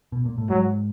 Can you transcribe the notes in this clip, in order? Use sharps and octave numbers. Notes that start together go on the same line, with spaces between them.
B2
A#2
A2
G#2 F#3